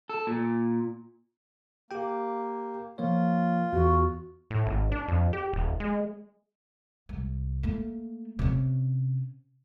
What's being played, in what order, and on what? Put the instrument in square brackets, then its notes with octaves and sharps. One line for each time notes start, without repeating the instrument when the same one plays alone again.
[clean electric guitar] A4
A#2
[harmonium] A#3 [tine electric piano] G4 G5
[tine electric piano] F3 A#3 C#5 [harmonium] F4
[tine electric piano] E2 [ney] F#4
[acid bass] A2
G#1
D4
F2
G4
D#1
G#3
[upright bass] C2
A3 A#3
C3 C#4